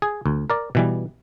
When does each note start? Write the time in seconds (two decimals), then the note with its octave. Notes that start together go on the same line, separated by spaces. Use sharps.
0.02 G#4
0.26 D2
0.50 A#4 D5
0.75 B2 E3 G3